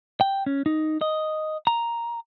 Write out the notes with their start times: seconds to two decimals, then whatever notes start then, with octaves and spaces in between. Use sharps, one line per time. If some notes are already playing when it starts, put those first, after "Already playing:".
0.21 G5
0.46 C#4
0.66 D#4
1.01 D#5
1.67 A#5